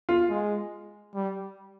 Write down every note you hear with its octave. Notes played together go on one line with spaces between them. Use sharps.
F4
G#3
G3